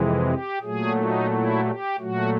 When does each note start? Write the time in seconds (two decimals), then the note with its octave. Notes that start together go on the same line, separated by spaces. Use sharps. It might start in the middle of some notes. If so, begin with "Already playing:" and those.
Already playing: F2 C3 E3 G#3
0.27 G4
0.61 A#2 F#3 A3 G#4
0.96 D#4
1.30 E4
1.65 G4
1.98 A#2 F#3 A3 F#4